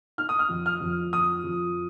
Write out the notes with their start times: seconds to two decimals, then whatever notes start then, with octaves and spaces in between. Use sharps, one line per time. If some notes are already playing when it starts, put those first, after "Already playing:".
0.18 D#4 F6
0.29 D#6
0.39 F6
0.49 F2
0.66 F6
0.81 F2
1.13 F3 D#6
1.43 F2